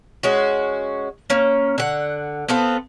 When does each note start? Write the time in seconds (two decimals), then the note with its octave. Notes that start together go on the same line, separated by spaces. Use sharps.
0.23 G#3 C#4 F#4
1.30 A#3 C#4
1.78 D3 F#5
2.48 B3 C4 F4 A4